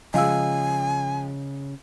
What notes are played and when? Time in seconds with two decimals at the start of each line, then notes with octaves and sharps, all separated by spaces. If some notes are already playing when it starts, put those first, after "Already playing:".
0.14 C#3 F3 G#3 D#5 F5 G#5 E6